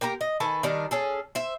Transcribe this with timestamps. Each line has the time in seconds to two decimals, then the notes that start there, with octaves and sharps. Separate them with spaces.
0.01 A#3 G4 A#4 A#5
0.21 D#5
0.40 D#3 A4 B4 G#5
0.63 D#3 G3 D4 A#4
0.91 C#4 G#4 A4
1.35 C5 E5